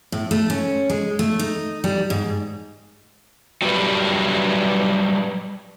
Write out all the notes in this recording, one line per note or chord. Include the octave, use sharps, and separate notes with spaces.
A2
A3
C#4
G#3
A3
D#4
G3
G#2
F#3 G3 G4 A#4 B4